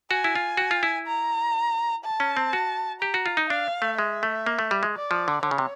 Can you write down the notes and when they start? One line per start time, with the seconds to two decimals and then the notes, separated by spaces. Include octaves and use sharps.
0.11 F#4 G#5
0.24 E4
0.36 F4
0.57 F#4
0.71 F4
0.83 E4
1.08 A#5
2.04 A5
2.20 C#4
2.37 C4
2.53 F#4
3.01 G4 A#5
3.14 F#4
3.26 F4
3.37 D#4
3.50 D4 F5
3.82 A3
3.98 G#3 E5
4.23 A3
4.46 A#3
4.59 A3
4.71 G3
4.83 G#3
4.95 D5
5.11 F3
5.28 D3
5.43 D3 C#5
5.51 C#3
5.58 C3